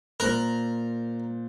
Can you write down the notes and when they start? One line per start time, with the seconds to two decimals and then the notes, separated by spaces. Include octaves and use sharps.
0.20 A#2 A#4 C5 F#6